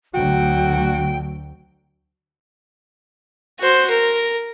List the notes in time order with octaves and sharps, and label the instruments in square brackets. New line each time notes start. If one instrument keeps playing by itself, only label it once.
[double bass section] D2 D3 F#3 [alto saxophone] F#4 [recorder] G5
[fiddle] F#4 C5
A#4